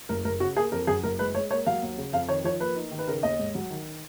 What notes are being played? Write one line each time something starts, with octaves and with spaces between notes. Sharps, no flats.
F#1 A#4
F#1 A#4
C#3 F#4
A#3 G#4
F2 A#4
F#2 G#4
F#1 A#4
G#3 B4
G#3 C#5
A#3 C#5
F#3 F5
D#2
C#3
F2 F5
D#3 C#5
F3 C#5
A#3 B4
D#4
D#3
B4
C#3 A#4
D#2 D#5
G#2
F#3
D#3